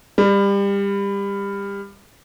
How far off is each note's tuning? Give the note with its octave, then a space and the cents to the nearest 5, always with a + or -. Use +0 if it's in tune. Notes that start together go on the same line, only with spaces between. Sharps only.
G3 +25